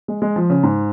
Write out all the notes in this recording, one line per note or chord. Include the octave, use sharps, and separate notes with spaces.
G#3
G#3
F3
C#3
G#2